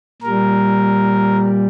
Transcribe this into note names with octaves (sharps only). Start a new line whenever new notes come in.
A#2 G3 A#4